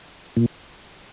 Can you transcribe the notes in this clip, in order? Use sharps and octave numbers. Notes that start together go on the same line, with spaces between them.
A#2